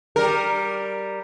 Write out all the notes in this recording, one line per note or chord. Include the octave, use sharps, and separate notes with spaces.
G3 A#4